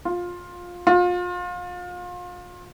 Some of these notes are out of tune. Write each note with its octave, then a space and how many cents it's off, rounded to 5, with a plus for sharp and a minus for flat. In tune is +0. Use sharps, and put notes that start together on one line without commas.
F4 +15
F4 +30